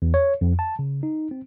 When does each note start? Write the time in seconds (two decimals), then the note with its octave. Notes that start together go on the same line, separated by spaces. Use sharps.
0.02 E2
0.14 C#5
0.41 F2
0.59 A5
0.79 C#3
1.03 D#4
1.31 C4